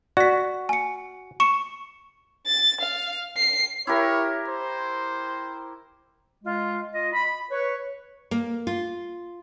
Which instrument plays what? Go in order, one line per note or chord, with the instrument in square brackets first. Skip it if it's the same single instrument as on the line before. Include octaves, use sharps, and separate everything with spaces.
[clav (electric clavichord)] F#4 [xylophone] D5 B6
[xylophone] G#5 C#7
C#6 C#7 E7
[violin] A6
F5
C7
[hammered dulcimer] E4 G4 A#4 [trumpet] C#5
[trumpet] C5
[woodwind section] G#3 F4
F4 D#5
B5
B4 C#5
[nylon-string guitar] A#3
F4